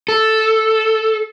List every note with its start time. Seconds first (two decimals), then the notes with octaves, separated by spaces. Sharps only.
0.08 A4